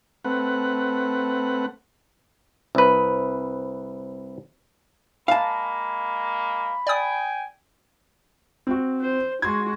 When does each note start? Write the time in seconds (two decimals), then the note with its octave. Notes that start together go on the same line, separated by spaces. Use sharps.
0.24 A3 C4 B4 F#5
2.75 C2 B4
5.28 G#3 A#3 F5 A5 B5
6.87 D5 G5 G#5 D#6
8.67 C4 F#4
9.01 C5
9.42 G#3 F#4 C6 G#6